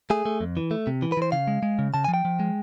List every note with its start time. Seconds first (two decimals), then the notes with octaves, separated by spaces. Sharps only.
0.10 A3 G#4
0.26 A3
0.41 F2
0.57 E3
0.71 A3
0.87 C3
1.02 E3
1.12 B4
1.17 E3 C5
1.32 C#3 F5
1.48 G#3
1.63 G#3
1.79 C#3
1.94 C#3 A5
2.04 G#5
2.08 F3
2.14 G5
2.25 F3
2.40 G#3